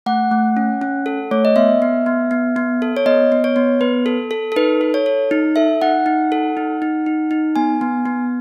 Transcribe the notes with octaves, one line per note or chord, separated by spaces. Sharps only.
A3 F#5
A3
C#4
C#4
A4
A3 C#5
D#5
B3 E5
B3
B3
B3
B3
A4
C#5
B3 D#5
B3
C#5
B3
B3 B4
A4
A4
A4
D#4 B4
A4
C#5
A4
D#4
A4 E5
D#4 F#5
D#4
A4
D#4
D#4
D#4
D#4
B3 G#5
B3
B3